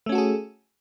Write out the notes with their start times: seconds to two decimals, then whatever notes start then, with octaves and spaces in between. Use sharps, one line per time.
0.06 A3
0.09 C#4
0.12 F#4
0.15 A4
0.18 G#4